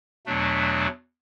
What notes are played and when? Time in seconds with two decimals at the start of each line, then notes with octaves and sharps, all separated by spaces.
0.26 E2 B2 F#3 A3 D4